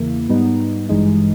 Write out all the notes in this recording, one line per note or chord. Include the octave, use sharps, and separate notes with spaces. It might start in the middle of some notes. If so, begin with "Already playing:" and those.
Already playing: E2 C#3 E3 A#3 E4
G#2 G3 B3 D#4
G#1 G2 E3 G#3 D#4